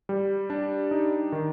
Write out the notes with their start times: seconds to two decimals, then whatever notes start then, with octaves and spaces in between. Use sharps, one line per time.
0.09 G3
0.50 D4
0.91 D#4
1.32 D#3